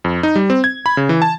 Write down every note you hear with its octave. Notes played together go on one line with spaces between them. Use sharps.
F2
D#4
G3
C4
G#6
B5
C#3
E3
A5